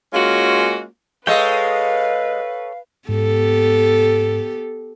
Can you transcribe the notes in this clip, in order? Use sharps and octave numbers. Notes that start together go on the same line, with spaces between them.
G#3 A#3 C#4 F4 F#4
G#3 G#4 A4 B4 C#5 F5 G5
G#2 B3 G4 A4